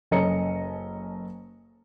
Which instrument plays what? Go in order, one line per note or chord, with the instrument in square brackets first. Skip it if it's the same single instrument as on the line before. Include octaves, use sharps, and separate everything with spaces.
[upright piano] F#1 C#4 A4 D#5 A#5 C#7